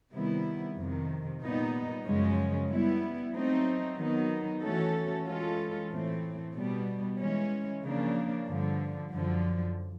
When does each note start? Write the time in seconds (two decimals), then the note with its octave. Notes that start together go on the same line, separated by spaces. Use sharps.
0.12 C3 D#3 G3 B3 E4
0.76 F2 C3 D#3
1.41 A#2 G3 B3 D#4
2.05 F#2 C#3 F3 G#3 C#4
2.69 G3 B3 E4
3.33 F#3 A3 C4 D#4
3.97 D#3 F#3 B3 D#4
4.62 E3 A3 C#4 F#4 A4
5.26 E3 G#3 C#4 F4 A4
5.90 A2 E3 A3 C4
6.54 B2 G3 B3
7.19 E3 G#3 C#4
7.82 C#3 F3 A#3 D4
8.47 G2 D3 F3
9.11 F#2 D3 F3